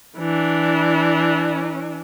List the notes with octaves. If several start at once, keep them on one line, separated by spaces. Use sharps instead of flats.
E3 D4